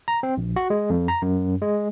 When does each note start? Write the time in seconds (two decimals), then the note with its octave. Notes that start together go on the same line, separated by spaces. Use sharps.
0.08 A#5
0.23 C4
0.37 A#1
0.56 F#4
0.70 G#3
0.90 F2
1.08 A#5
1.22 F#2
1.62 G#3